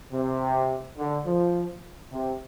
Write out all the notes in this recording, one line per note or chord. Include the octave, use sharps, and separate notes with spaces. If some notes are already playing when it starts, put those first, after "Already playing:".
C3
D3
F3
C3